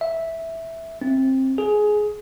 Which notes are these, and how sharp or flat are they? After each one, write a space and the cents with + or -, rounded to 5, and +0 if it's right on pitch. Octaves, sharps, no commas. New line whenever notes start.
E5 -5
C4 +20
G#4 +15